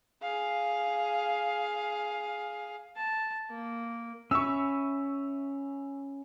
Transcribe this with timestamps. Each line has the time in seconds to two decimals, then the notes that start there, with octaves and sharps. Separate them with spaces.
0.22 G#4 F5
2.96 A5
3.50 A#3
4.31 C#4 E5 B5 C#6 E6